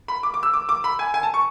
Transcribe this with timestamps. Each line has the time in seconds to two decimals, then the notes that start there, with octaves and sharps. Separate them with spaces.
0.08 B5
0.23 D6
0.34 D6
0.43 E6
0.54 D6
0.69 D6
0.84 B5
0.99 G#5
1.14 G#5
1.23 A5
1.34 C#6